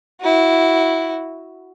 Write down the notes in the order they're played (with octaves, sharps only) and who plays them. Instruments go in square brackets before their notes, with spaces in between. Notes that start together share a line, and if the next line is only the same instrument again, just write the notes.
[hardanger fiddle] E4 F#4